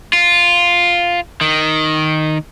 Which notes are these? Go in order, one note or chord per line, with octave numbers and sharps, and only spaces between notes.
F4
D#3